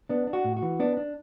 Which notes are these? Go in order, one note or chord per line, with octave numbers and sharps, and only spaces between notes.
B3 D4
D4
F#4
A2
F#4
E3
B3 D4
D4